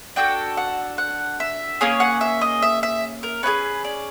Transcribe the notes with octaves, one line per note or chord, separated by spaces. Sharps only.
D4 F#4 A4 G5
F#5
F#5
E5
A#3 C#4 G#4 C#5
F#5
E5
D#5
E5
E5
A#4
C#4 F4 G#4 B4
D5